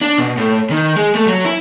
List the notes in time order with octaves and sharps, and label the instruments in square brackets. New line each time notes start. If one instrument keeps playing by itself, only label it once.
[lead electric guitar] D4
B2
A2
D#3
G#3
A3
F#3
E4